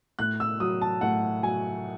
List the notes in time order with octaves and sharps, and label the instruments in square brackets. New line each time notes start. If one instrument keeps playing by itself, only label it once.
[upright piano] A2 F#6
E6
F#3 D#6
A5
A2 F#5
F#3 G#5